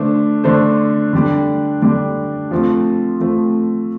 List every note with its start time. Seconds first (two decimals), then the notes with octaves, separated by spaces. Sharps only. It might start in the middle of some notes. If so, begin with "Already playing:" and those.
Already playing: D3 A3 D4 A4 C5
0.44 D3 A3 D4 A4 C5
1.13 D3 G3 D4
1.82 D3 G3 D4
2.51 F3 A3 C4
3.20 F3 A3 C4